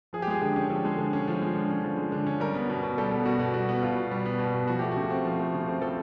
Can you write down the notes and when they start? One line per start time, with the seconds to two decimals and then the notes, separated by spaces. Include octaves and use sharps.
0.13 F3 G#4
0.22 G4
0.27 G#3 G#4
0.41 D3 G4
0.56 C#4
0.70 F3 A4
0.85 G#3
0.98 D3
1.13 C#4
1.28 F3
1.42 G#3
1.55 D3
1.70 C#4
1.84 F3
1.97 G#3
2.12 D3
2.27 C#4
2.40 G3 A#4
2.55 B3
2.70 B2
2.83 B2
2.98 G3 A4
3.11 B3
3.26 B2 F#4
3.39 B2
3.54 G3 F#4
3.69 B3
3.82 B2 F4
3.97 B2
4.11 G3
4.26 B3
4.39 B2
4.54 B2
4.67 F3 F#4
4.79 A3 G4
4.92 C#3 F#4
5.10 C4
5.25 F3
5.39 A3
5.54 C#3
5.67 C4
5.81 F3 A4